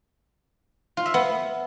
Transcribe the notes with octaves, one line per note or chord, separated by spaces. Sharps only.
F4
E5
B3